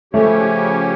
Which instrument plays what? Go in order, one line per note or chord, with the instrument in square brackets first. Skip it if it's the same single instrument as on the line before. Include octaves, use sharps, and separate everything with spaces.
[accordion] C#3 F3 C#4 G4 C#5 [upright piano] A3